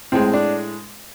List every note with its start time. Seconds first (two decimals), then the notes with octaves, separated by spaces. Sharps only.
0.12 A2 G#3 C4
0.34 D4